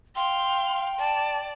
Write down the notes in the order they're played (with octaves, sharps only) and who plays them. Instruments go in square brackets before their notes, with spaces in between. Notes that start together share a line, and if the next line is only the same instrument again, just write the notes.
[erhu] F5 [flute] G5 [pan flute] C6
[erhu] D5 [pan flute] A5